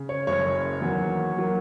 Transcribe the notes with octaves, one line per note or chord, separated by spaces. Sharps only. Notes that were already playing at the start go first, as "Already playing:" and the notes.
Already playing: C#3
C#5
F#1 F#2 C#3 C#5
E2 D#3 F#3 A#3
D#3 F#3 A#3